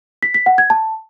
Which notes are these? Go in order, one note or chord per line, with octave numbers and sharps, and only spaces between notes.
B6
B6
F#5
G#6
A5